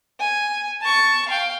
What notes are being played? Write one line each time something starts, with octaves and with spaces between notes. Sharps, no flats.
G#5
A5 C#6
F5 G5